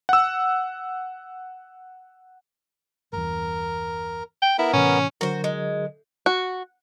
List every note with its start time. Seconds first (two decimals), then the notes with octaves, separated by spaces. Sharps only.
0.09 F#5 E6
3.13 G1 E2 A#4
4.42 G5
4.58 B3 E4 A#4
4.73 A2 C3 E3 C#4
5.21 D3 F#3 F#4 A#4 C5
5.44 G#3
6.26 F#4